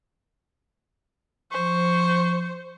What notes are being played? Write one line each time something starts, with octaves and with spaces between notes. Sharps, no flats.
F3 C5 C#6